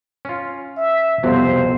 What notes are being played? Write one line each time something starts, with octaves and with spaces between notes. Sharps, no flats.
C#4 F4
E5
C2 F2 B2 F#3 C5